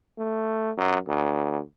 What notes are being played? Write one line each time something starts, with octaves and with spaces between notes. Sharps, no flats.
A3
F#2
D2